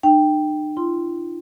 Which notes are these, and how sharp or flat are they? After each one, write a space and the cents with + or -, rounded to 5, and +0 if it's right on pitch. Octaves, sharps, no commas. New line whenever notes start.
D#4 -45 G5 +0
F4 -35 C6 +0